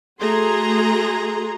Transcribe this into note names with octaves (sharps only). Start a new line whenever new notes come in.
A3 F#4 G#4 A4 A#5 C6